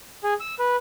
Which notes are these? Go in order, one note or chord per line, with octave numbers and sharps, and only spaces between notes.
G#4
E6
B4